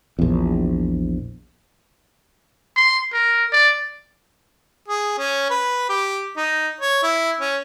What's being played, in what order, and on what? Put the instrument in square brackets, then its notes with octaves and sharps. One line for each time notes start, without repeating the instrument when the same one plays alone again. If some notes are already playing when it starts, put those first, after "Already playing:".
[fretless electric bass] A#1 E2
[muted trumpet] C6
A#4
D5
[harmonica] G#4
C#4
B4
G4
D#4
C#5
E4
C#4